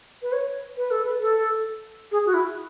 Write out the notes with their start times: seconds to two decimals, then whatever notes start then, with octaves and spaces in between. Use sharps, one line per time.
0.22 B4
0.32 C#5
0.77 B4
0.91 A4
1.05 B4
1.22 A4
2.11 G#4
2.26 F#4
2.34 E4